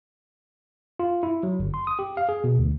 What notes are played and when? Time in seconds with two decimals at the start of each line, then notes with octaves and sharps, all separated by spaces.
0.99 F4
1.23 E4
1.43 F#3
1.59 G1
1.74 C6
1.87 D#6
1.99 G4
2.17 F5
2.29 G#4
2.44 B2
2.59 D2